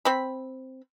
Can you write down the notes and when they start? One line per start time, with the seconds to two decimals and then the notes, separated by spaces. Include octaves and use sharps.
0.05 C4 B5